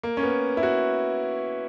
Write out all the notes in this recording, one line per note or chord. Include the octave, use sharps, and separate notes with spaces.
A#3
C#4
B3
E4
F#4